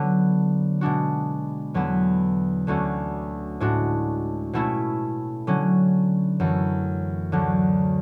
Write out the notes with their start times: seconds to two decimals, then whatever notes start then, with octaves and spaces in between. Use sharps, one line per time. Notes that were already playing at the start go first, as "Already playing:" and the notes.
Already playing: D3 F#3 B3
0.81 B2 G#3 D4 F#4
1.74 E2 D3 F#3 B3 E4
2.67 D2 D3 A3 C#4 F#4
3.60 A2 G#3 D4 F#4
4.53 B2 A3 C#4 E4
5.47 D3 F#3 C#4
6.40 F#2 E3 A3
7.32 D2 D3 F#3